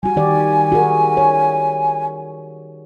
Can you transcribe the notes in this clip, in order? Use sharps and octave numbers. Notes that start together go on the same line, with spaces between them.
G3 F#4 G#5
D#3 G4 D5
F#4 G#4 A#4
C#5